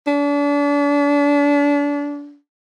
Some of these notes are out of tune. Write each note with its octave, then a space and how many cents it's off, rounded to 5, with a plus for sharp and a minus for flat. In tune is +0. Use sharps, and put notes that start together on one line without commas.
D4 -35